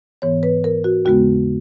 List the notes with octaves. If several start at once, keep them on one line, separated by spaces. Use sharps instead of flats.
G#2 E3 B3 C#5
B4
A#4
F#4
D#2 C#3 G#3 B3 F#4